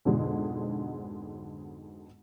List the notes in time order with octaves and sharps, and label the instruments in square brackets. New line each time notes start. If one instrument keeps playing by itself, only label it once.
[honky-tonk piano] B1 F2 G#2 B2 D3 G#3